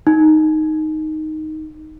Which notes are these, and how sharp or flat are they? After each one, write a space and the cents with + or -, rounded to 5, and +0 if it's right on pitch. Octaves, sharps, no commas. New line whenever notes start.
D#4 +0